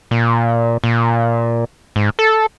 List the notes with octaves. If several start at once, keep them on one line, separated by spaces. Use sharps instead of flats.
A#2
A#2
G#2
A4